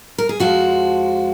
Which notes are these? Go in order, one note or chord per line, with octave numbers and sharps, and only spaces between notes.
A#4
G#4
F2 F3 G#3 F#4